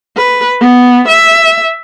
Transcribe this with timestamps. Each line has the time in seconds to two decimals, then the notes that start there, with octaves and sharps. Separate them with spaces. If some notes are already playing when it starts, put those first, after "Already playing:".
0.17 B4
0.61 B3
1.08 E5